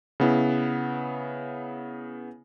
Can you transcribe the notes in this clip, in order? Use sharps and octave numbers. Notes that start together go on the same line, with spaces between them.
C#3 B3 E4